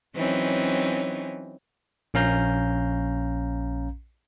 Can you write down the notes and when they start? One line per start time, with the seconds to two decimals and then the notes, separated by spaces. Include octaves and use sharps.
0.14 E3 F#3 C4 C#4 D#4
2.14 A#1 C#4 F5 A#5 G6